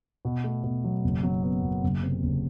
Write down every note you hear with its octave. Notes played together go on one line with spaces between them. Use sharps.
B2
A3
B2
F#3
F#1
F#3
B3
F#2
F#1
C3
F#1